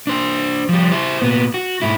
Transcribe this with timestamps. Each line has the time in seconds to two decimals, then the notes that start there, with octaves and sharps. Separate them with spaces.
0.07 D4 C5
0.69 F3 G3
0.91 E4 C5
1.21 A#2 B3
1.54 F#4
1.82 G#2 E4